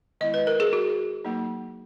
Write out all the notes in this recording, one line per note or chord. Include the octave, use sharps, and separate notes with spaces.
D#3 G#3 B3 E4 D#5
B4
A#4
G#4
F#4
F#3 A#3 D#4